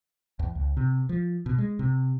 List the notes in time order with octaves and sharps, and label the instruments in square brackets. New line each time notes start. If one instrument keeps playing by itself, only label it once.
[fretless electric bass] E2
C#2
C3
F3
B2
G#3
C3